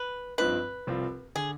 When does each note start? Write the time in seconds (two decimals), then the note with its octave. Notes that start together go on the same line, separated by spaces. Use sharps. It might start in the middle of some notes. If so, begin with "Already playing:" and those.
Already playing: B4
0.38 G2 F3 C4 D#4 B4
0.87 C2 C3 F3 C4 F4
1.35 D3 G#4